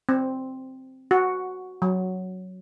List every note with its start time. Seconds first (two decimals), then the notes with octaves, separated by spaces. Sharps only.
0.09 C4
1.11 F#4
1.82 F#3